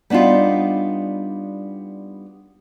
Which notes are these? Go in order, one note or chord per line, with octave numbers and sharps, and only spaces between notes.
G3 B3 D4 D#4 F4